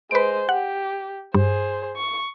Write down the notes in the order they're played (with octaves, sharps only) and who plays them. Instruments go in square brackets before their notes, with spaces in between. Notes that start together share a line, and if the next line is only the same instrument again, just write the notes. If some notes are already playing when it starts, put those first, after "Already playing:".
[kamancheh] G#3 C5 [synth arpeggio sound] B4 D7
[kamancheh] G4 [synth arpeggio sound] F#5
[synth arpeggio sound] G2 [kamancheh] G#4 C5
[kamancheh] C#6